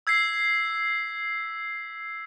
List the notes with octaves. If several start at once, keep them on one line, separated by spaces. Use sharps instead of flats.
E6 G#6 B6 C7